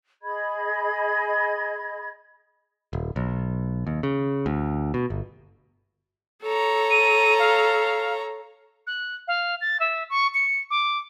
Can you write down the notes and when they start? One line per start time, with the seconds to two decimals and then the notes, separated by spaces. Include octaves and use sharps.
0.23 G#4 D#5 B5 G#6
2.93 D#1
3.16 B1
3.87 D#2
4.03 C#3
4.46 D2
4.94 B2
5.10 G1
6.43 A4 C#5 A#5
6.91 D#7
7.39 F5
8.87 F#6
9.27 F5
9.61 A6
9.80 E5
10.10 C#6
10.34 C#7
10.70 D6